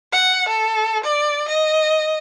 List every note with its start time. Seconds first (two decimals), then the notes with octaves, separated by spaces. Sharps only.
0.13 F#5
0.49 A4
1.04 D5
1.49 D#5